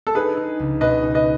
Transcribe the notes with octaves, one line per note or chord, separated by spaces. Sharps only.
A4
D#4 G#4 B4
D#4
C#2
B2 B4 D#5
D#4
B4 D#5